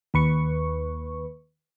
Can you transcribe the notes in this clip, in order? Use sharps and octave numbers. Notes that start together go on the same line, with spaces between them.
D#2 B4 C#6